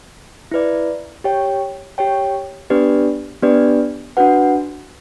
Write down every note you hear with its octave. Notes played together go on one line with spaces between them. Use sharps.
E4 B4 D5
G4 C#5 G5
G4 C#5 G5
B3 D4 G4 B4 D5
B3 D4 G4 B4 D5
D4 F#4 B4 F#5